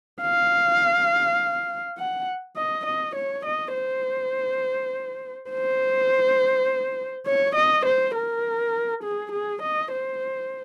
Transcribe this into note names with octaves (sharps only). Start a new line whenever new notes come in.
F5
F#5
D#5
D#5
C#5
D#5
C5
C5
C#5
D#5
C5
A#4
G#4
G#4
D#5
C5